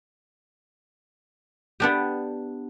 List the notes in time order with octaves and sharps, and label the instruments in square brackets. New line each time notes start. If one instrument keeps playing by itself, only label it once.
[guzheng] B3 D4 G4